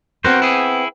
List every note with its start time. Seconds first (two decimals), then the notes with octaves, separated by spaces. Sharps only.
0.24 B3 C4 F#4 A#4 C5 F#5
0.42 E4 G#4